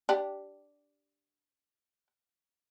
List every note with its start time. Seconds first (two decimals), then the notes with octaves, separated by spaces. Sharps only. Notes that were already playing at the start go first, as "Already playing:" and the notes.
0.09 D4 G4